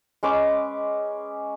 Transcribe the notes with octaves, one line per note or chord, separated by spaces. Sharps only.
G#3 C#4 B4 D6